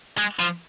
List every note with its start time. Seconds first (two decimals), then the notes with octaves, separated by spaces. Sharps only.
0.18 G#3
0.39 F3